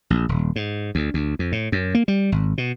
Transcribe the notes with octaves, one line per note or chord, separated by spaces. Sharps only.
A#1
D#1
G#2
D2
D2
F2
A2
F#2
A#3
G3
G#1
B2